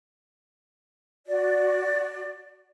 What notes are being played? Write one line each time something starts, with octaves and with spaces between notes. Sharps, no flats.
F#4 D5